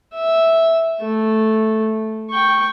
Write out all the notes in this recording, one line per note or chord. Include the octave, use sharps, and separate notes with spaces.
E5
A3
G5 C#6